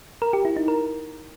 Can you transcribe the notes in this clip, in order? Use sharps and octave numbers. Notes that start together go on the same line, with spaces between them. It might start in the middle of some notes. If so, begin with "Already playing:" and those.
A#4
G4
E4
D#4
A#4